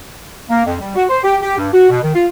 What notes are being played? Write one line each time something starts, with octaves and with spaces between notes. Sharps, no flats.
A#3
F2
G3
F#4
C5
G4
G4
G2
F#4
B2
D#3
F4